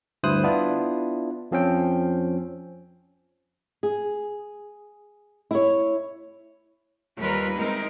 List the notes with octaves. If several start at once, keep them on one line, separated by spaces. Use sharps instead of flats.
D2 G2 E4 C5 D#6 F#6
B3 D4 E4 F4
F2 F3 C4 C#4 G5
G#4
E4 C#5
D#2 G3 F4 A#4 B4
G#3 C4 D#4 E4 A#4